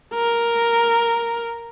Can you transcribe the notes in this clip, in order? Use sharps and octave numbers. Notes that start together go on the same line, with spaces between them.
A#4